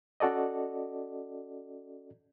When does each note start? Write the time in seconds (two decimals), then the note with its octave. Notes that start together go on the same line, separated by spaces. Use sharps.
0.20 C#4 F#4 A4 D5 D#5